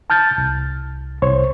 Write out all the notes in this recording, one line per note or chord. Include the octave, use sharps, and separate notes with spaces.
A5 F6 G6 A6
C2
C2 C5 C#5